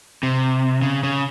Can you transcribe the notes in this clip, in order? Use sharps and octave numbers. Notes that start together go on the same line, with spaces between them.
C3
C#3
C#3